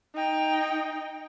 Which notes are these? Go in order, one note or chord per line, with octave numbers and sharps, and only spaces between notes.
D#4 G5